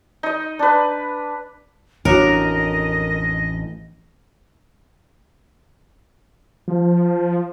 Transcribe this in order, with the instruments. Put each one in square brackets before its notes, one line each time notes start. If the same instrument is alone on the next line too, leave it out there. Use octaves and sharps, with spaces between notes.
[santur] D#4 D#5
D4 B4
[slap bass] A1 F2 [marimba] D4 F#4 C#5 [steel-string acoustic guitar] A#4 [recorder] D#5
[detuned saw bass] F3